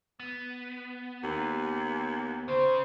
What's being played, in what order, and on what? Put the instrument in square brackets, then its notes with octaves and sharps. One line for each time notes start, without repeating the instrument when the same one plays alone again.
[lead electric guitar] B3
[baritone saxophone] D#2
[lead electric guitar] C#3 [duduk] C5